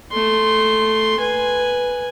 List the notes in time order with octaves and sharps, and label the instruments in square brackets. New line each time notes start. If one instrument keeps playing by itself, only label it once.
[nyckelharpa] A3 C6
B4 G#5